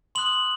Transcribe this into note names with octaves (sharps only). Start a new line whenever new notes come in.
C6 D#6 F#6 F#7